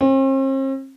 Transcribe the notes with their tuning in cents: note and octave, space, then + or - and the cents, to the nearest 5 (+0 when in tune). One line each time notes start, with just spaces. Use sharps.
C4 +45